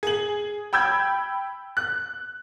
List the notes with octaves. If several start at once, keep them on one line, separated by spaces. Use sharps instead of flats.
G#4 F#7
G5 B5 E6 G6 G#6
F#6